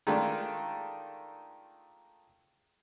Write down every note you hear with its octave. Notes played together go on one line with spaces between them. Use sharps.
D#3 G#3 A3 D4 F4